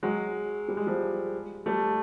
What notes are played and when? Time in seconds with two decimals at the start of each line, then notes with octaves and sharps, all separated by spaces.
0.03 F#3 G#3
0.68 G3
0.77 G#3
0.86 F3 G3
1.66 G3 A3